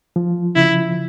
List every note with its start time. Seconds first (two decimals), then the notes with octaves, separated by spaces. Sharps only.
0.16 F3
0.56 C#3 E4